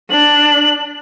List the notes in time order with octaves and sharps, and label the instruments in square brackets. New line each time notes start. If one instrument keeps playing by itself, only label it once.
[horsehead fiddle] D4 [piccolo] F#7